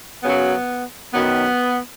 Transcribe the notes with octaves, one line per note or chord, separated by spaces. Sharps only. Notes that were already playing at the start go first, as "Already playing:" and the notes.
F#2 C#3 F#3 B3
F#2 D#3 F#3 B3